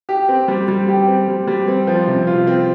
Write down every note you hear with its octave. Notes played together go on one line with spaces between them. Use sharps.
G4
C4
G3
G3
G4
C4
G3
G3
C4
F3
C3
F4
C4